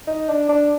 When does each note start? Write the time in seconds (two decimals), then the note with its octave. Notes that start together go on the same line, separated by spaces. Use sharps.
0.07 D#4
0.29 D4
0.49 D4